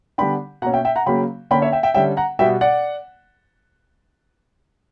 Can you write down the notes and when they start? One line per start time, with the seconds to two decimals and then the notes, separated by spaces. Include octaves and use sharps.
0.18 D3 G3 B3 D4 G5 B5
0.62 B2 A#3 C#4 F#5 A#5
0.73 E5 G5
0.85 E5 G5
0.96 F#5 A#5
1.06 C#3 F#3 A#3 C#4 G5 B5
1.51 D3 A#3 C#4 G5 B5
1.62 C#5 E5
1.72 E5 G5
1.83 E5 G5
1.94 D3 G3 C#4 E5 G5
2.17 F#5 A#5
2.39 B2 G3 B3 E5 G5
2.61 D5 F#5